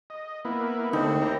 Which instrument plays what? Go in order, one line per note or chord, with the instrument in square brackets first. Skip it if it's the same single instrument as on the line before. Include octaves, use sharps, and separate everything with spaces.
[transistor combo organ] D#5
A#3 B3 E4
[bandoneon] D#2 C4 [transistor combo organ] D3 A3 [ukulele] D#4
[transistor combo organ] E4 G4 A#5